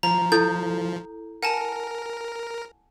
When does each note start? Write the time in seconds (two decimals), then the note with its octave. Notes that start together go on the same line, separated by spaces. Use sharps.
0.03 F3 A#5
0.32 E4 A4 G6
1.43 A#4 F#5 G#5 A5